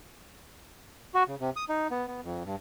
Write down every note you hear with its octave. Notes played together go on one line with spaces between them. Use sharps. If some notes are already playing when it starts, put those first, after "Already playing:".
F#4
C#3
C3
D#6
D#4
B3
B3
F2
G2